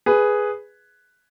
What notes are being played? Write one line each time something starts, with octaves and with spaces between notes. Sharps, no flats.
G#4 B4